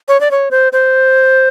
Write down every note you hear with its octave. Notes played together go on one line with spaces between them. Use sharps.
C#5
D5
C#5
C5
C5